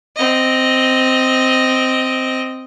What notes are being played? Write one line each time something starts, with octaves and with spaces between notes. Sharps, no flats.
C4 D#5